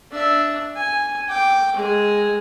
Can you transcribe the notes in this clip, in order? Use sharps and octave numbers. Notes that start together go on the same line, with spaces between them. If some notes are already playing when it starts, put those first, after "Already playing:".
D4 E5
G#5
G5 D6
G#3 G#4